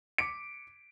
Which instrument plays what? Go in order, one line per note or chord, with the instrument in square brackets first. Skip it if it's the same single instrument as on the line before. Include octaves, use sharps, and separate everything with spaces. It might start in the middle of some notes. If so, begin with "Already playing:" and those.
[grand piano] D6 B6 C#7 D7